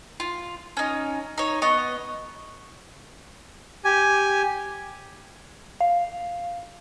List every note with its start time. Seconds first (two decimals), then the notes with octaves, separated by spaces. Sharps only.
0.20 F4
0.77 C#4 D#4
1.38 D#4 C#5
1.62 B3 D#5 C#6
3.85 G4 G#5
5.81 F5